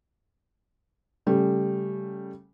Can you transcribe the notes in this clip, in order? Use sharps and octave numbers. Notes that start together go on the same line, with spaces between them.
C#3 G3 A3